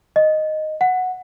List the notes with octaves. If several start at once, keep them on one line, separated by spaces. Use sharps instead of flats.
D#5
F#5